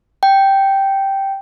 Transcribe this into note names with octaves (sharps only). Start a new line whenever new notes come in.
G5